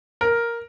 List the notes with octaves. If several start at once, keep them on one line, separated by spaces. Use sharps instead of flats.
A#4